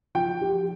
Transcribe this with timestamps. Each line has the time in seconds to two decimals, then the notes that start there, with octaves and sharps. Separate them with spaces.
0.15 F3 G5
0.41 G4